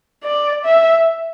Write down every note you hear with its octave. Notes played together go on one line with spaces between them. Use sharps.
D5
E5